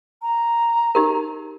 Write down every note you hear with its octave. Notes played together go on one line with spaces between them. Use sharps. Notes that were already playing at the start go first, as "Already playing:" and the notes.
A#5
D#4 G4 A#4